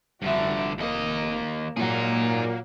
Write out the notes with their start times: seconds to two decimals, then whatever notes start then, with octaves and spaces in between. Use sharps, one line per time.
0.22 F1 G2 D3 F#4 E5
0.78 D#2 A#3 D#5
1.77 A#2 F#3 A#3 D#4 G#4